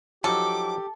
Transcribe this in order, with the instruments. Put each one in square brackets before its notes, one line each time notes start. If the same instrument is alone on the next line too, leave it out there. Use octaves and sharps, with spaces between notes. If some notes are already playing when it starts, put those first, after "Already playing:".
[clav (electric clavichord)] F3 F#3 D#4 [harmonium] G4 [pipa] A4 [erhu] D6